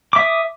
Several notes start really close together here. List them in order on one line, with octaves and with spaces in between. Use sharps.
D6 E5 D#6